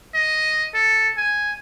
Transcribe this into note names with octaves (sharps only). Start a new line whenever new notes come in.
D#5
A4
G#5